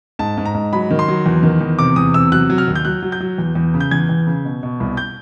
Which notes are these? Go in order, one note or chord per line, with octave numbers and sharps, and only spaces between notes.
G#2 A5
G#2
A#5
G#2
F#3 B5
D#3
C6
F#3
E2
D#3
E2
C3 D6
E2 D#6
C3 E6
F#3 F#6
F#3
F6
D#2
G6
F#3 F#6
F#3
G6
F#3
E2
E2
C#3
G6
E2 G#6
E2
C#3
B2
B2
C2
G6